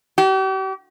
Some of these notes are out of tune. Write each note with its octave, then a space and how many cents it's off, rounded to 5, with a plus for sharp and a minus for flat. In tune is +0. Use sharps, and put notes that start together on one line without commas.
G4 -40